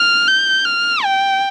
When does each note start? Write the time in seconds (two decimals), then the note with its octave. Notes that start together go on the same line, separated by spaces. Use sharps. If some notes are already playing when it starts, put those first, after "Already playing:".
Already playing: F6
0.28 G6
0.65 F6
1.04 G5